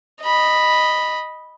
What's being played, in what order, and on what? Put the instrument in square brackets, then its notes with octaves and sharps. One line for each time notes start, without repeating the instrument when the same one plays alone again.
[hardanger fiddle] D#5 B5